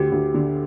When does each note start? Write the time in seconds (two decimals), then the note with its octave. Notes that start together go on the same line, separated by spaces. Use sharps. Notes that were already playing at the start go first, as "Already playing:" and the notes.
Already playing: D2 G4
0.12 D2
0.34 D3